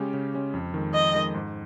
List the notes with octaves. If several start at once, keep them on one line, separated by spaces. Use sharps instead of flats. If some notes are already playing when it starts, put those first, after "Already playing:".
Already playing: C#3 G#3 C#4 G4
C#3
G#3 C#4 G4
F2
D#3 G#3
F2 D#5
D#3 G#3
G#2